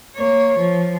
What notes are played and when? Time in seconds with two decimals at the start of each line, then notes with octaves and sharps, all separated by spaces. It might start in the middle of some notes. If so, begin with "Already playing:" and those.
0.17 A#3 C#5
0.58 F3